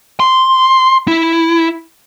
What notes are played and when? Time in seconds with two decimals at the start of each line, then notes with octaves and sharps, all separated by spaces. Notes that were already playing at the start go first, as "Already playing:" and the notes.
0.20 C6
1.08 E4